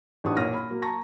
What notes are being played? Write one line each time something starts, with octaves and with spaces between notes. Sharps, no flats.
A1 D4 D#4 G4 C#6 D#6
A#2 F4 C#5 F6 A#6 D#7
B5
F#3 A#3
A5 A#5 C#6 A#6